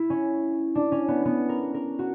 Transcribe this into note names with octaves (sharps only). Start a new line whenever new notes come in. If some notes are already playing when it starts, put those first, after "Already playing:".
Already playing: E4
C#4
D4
C#4
B3
B3
A#4
A#4
F#4